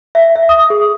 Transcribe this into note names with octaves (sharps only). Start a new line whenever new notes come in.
E5
E5
D#6
G#4